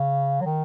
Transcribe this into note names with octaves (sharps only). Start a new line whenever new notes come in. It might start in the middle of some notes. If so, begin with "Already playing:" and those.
Already playing: C#3
F#3
D#3